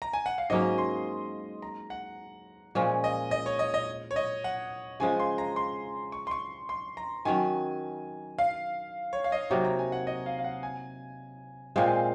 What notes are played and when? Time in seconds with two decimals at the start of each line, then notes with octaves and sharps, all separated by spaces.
0.02 A#5
0.13 G#5
0.26 F#5
0.38 F5
0.50 G#2 F#3 A#3 C#4 D#5
0.78 C6
1.62 A#5
1.90 F#5
2.75 A#2 F3 G#3 C#4
3.04 D#5
3.31 D#5
3.46 C#5
3.59 D#5
3.74 D#5
4.11 C#5
4.16 D#5
4.44 F#5
5.00 C#3 F3 G#3 G#5
5.19 C6
5.38 A#5
5.56 C6
6.12 C#6
6.27 C6
6.31 C#6
6.69 C6
6.97 A#5
7.25 D#3 F#3 C#4 G#5
8.38 F5
9.13 C#5
9.24 F5
9.32 D#5
9.50 C3 F#3 A#3 D#4 C#5
9.65 A#5
9.79 G#5
9.92 F#5
10.07 D#5
10.26 F5
10.39 F5
10.44 F#5
10.63 G#5
11.76 A#2 G#3 C4 F5